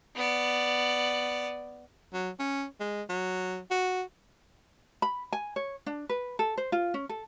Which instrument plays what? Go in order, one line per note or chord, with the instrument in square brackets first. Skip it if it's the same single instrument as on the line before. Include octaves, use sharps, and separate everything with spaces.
[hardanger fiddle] B3 D5
[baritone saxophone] F#3
C#4
G#3
F#3
F#4
[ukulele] B5
G#5
C#5
D4
B4
A4
C5
F4
C#4
A4